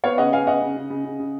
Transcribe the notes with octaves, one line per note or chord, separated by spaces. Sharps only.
B3 C#5 F5
C#3 D#5 F#5
B3 F5 G#5
C#3 D#5 F#5
C#3
C#3
C#3
C#3
C#3